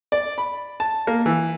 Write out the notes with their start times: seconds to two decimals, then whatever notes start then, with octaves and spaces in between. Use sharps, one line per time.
0.12 D5
0.38 B5
0.80 A5
1.07 A#3
1.26 E3